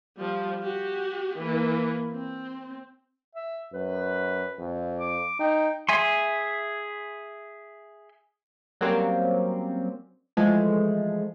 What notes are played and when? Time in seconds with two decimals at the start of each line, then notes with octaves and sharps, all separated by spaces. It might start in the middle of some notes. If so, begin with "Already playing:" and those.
0.17 F3 G3
0.62 F#4 G4
1.38 E3 A#3
2.11 C4
3.35 E5
3.74 F#2 B4
4.59 F2
4.99 D6
5.40 D#4 G5
5.89 G#4 E5 G#5 C6
8.81 F#3 G3 A#3 C4 C#4 G4
10.37 E3 F3 G#3 A3